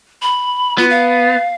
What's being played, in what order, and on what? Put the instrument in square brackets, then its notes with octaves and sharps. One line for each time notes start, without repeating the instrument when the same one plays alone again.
[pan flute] B5
[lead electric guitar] B3 [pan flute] F4
[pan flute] F5